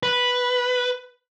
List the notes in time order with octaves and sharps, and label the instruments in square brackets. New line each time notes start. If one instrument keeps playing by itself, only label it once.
[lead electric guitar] B4